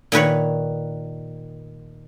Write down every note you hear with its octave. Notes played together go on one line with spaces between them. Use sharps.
A#2 D#3 B4 C#5